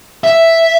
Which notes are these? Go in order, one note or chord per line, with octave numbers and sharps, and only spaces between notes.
E5